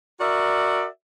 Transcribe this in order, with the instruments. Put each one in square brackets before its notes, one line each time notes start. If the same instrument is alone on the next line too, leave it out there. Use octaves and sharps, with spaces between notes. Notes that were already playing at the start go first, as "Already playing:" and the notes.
[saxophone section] F#4 A#4 D5 E5